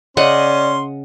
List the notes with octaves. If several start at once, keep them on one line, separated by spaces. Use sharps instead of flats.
C#3 C#4 D5 D#5 F#5 C6